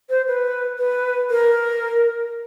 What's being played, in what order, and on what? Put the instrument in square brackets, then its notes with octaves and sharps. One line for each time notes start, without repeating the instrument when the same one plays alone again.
[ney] C5
B4
B4
A#4